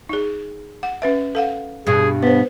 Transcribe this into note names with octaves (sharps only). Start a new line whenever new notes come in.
D#4 G#4
F#5
C#4 B4 E5
A4 F5 F#5
G2 B2 G#4
B3 B4 C5